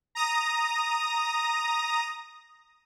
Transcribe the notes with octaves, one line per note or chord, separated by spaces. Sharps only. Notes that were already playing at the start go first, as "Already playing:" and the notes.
A#5 D#6 A#6